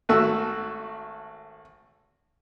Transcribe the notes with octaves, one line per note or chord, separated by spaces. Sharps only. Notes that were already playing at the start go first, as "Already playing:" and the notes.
G#1 A3 F#4 A4 E6